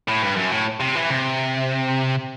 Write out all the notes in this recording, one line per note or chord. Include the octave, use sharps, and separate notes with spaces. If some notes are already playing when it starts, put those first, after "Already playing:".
A2
G2
F#2
A2
C3
E3
C3